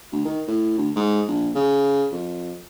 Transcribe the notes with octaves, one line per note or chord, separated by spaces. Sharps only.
D2
D#3
A2
D2
G#2
A#1
C#3
F2